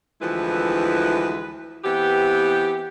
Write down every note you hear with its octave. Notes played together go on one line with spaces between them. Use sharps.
D2 E3 F3 G#3 E4 B4
E3 B3 C4 G4